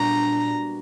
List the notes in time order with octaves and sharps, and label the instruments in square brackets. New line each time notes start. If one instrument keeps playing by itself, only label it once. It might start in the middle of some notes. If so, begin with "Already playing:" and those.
Already playing: [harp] A#2 G3 B3 D4 F#4 [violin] A#5